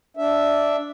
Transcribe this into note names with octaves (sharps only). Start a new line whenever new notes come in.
D4 E5